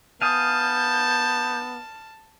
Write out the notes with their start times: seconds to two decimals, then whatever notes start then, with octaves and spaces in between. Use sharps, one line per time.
0.22 B3 F5 G#5 A5 D#6 G6